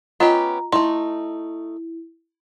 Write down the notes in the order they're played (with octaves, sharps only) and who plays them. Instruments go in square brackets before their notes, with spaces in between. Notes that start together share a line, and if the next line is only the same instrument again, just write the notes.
[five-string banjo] B3 C#4 G4 [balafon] F4 D#5 [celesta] A#5
[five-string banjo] A3 D#4 [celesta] E4 [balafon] C6